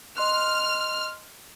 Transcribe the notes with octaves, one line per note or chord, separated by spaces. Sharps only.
D#5 C6 F6 F#6